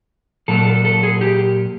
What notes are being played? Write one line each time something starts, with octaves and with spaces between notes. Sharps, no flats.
A#2 F#3 A#3 A4
A4
A4
G#4
G4